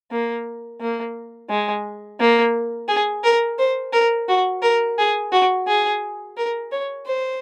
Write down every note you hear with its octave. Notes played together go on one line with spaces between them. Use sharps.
A#3
A#3
G#3
A#3
G#4
A#4
C5
A#4
F#4
A#4
G#4
F#4
G#4
A#4
C#5
C5